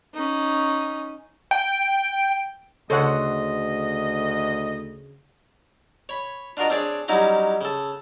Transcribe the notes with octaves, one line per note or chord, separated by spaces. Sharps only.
C#4 D#4
G5
D2 C#3 A4 C#5 D#5 F#5 C6
C#5 B5
D4 F4 F#4 A#4 D#5
C4 D4 G#4 C#5 D5
F#3 G3 C#4 D#4 E4 F#4
C#3 A4